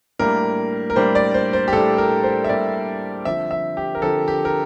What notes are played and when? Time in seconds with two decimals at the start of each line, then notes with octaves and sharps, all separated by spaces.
0.19 A2 G3 A#3 D4 A#4
0.90 A#4
0.96 A2 G3 A#3 D4 C5
1.15 D5
1.34 C5
1.53 C5
1.68 G4
1.73 A2 G3 A#3 D4 A4
1.98 A#4
2.23 C5
2.44 E5
2.49 A2 G3 A#3 D4 D5
3.25 D3 F3 C4 E5
3.51 E5
3.77 G4
3.95 A#4
4.02 D3 F3 C4 A4
4.28 G4
4.45 A#4